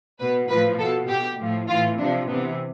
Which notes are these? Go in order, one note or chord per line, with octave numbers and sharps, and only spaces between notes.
B2 B4
A2 F3 B4
B2 A4
B2 G4
A2 F3
A2 E3 F4
C3 F3 D4
C3 E3 B3